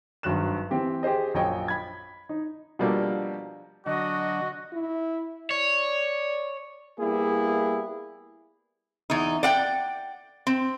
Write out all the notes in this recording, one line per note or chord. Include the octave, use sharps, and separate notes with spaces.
G#1 G2 F#3 F#6 E7
E3 C4 G4
G4 G#4 C5 D#5
A#1 F#2 C#5 D#5 G5
B5 G#6
D#4
B2 F3 G3 A#3 D4 A4
D3 F#3 F#4 D#5
E4
C#5 D5
G3 A#3 B3 E4 G#4
E2 D#4
D5 F#5 G5
C4